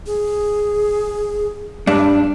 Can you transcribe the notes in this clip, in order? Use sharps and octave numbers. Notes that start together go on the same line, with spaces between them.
G#4
G2 D4